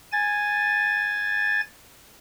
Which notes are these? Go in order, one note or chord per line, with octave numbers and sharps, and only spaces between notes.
G#5 A6